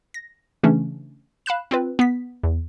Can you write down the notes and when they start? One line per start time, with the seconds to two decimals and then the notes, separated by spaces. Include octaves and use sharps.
0.14 A#6
0.63 C#3 E3 A3 C#4 D4
1.46 F5 B5 F#6 E7
1.71 C4 F4 B4
1.99 B3 B6
2.43 E2